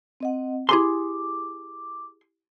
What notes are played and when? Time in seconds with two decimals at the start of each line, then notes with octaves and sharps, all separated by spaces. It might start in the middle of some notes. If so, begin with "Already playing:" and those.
0.20 C4 D#5 F#5
0.69 E4 G4 G#4 G#5 C6 D6